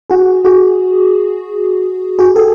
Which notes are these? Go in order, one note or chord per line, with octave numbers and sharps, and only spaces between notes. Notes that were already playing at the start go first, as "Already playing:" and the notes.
F#4 G#4
F#4 G#4
F#4 G#4
G4 A4